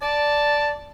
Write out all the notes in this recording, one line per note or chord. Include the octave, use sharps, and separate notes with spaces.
D5 A5